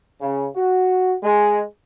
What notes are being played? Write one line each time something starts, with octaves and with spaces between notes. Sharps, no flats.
C#3
F#4
G#3